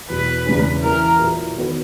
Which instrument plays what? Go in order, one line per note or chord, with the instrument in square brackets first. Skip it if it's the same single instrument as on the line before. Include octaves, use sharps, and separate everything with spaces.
[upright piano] E2 B2 F#3 [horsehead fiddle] B4
[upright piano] E2 C#3 E3 G#3 C#4
[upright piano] E3 A#3 E4 [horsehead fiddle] A#4
[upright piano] A#2 F#3 A#3 E4 B4
D#3 F#3 B3 F#4 B4